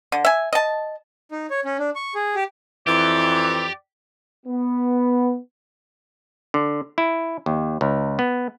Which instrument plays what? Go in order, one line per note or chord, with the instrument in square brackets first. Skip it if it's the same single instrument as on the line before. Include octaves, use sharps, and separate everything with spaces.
[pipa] D3
E5 G#5
D#5 A5
[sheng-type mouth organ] D#4
C#5
C#4
D4
C#6
G#4
G4
[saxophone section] F2 E3 [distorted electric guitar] G4 [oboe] D5
[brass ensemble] B3
[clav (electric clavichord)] D3
E4
D#2
C#2
B3